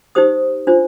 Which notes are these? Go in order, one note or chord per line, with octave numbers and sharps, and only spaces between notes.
D#4 G4 C5 D#6
D4 F4 C5